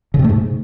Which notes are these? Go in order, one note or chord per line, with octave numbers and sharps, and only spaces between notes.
C#3
C3
A3
G#2